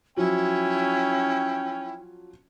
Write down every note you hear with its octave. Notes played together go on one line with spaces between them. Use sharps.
F3 F#3 C#4 E4 G5